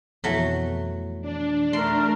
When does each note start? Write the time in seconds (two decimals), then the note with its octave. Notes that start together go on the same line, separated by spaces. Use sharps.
0.24 F2 B2 E3 F#3 A3
1.22 D4
1.73 A3 A#4 C6